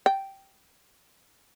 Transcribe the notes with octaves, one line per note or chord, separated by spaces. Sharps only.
G5